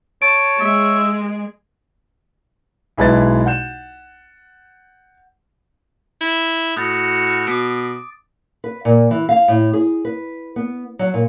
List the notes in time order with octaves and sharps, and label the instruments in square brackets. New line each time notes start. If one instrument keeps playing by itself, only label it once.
[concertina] C#5 [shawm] A5 [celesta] D7
[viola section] G#3 [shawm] E5
[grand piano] B1 G#3 E4 B4 A6
F#5 G6 E7
[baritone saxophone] E4
[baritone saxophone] A2 [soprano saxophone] F#4 [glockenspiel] D#6 A6
[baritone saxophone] B2 [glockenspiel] D6 D7
[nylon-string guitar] B4
A#2
E3
F5
A2
G#4
B4
B3
F#3
A#2